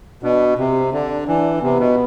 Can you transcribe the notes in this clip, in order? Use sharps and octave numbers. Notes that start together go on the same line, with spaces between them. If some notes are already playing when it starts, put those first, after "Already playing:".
B2 D4
C3 C4
D3 D4
E3 D4
C3 B3
B2